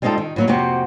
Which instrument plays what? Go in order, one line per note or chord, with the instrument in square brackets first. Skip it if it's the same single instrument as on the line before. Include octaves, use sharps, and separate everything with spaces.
[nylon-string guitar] G3 G#3 C4 D#4 F4 A4
D#3
A2 F#3 A#3
F2 C3 A#3 C4 F#4 G4